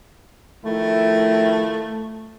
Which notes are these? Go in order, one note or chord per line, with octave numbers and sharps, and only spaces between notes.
D#3 F3 A3 E4